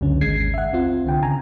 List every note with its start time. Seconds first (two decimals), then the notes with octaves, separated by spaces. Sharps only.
0.01 C#2 F#2 D3 C#4
0.21 G#1 D#2 G#3 G#6 C7
0.54 E5 F#5
0.73 C4 F4
1.04 C2 D3 G5
1.22 C#3 G#5 A#5